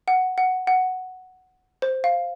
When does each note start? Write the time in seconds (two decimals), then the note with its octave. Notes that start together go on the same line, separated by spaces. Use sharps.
0.08 F#5
0.38 F#5
0.67 F#5
1.82 C5
2.04 F5